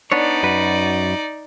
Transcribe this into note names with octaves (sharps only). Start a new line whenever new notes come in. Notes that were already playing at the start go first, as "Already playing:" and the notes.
B3 D4 D#4 C#5 D5
F#2 F#4 B4